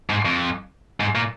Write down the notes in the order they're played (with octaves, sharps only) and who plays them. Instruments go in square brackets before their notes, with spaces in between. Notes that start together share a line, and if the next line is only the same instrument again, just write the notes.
[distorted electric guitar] G#2
F2
G#2
A#2